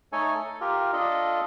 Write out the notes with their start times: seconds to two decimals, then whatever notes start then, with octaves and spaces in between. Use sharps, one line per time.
0.13 A3 D#4 A4 C#5 G#5
0.35 A4
0.61 F4 G4 A#4
0.93 D4 F4 A4 D#5